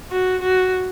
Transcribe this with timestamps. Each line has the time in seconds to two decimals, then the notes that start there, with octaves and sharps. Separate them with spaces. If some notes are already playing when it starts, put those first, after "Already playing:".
0.10 F#4
0.43 F#4